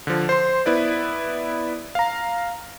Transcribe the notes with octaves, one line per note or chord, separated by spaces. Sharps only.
D3 F3
C5 C6
B3 E4 B4 D5
F5 A#5